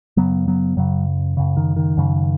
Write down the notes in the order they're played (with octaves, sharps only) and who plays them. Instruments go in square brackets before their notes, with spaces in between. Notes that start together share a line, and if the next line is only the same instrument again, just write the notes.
[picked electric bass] F#2 C#3 F#3 B3
F#3 B3
F#2 C#3 F#3
F#2 C#3
D#3
D#3
F#2 C#3